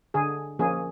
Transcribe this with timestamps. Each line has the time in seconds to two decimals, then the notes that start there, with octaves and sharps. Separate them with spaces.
0.14 D3 G#4
0.59 F3 A#3 C#4 G#4